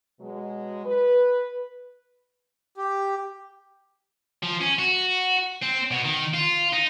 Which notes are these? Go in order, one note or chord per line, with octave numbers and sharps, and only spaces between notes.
B2 F#3 G#3
B4
G4
F3
C#4
F#4
C4
B2
D#3
F4
D#4